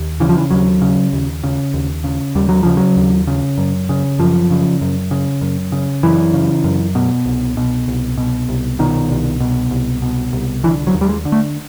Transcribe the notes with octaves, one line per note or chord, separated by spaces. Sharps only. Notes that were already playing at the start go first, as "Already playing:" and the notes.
Already playing: D#2
C#3 E3
F3
E3
D#2 F#3
C#3
D#2
C#3
D#2
C#3
D#2 G3
F#3
C#3 F3
F#3
D#2
C#3
F#2
C#3
F#2 F3
C#3
F#2
C#3
F#2
C#3
F#2 E3
C#3
F#2
B2
C2
B2
C2
B2
C2
B2 D#3
C2
B2
C2
B2
C2
D3 E3
F#3
D#2
G3
G#3
D3
A3